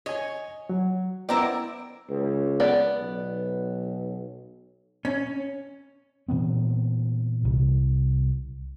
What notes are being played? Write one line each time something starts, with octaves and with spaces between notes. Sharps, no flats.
C#5 D#5 G#5
F#3
B3 E4 A#4 C5 D5 G5
C#2
B3 D5
B1
C#4
A#2 E3 B3 C4
C2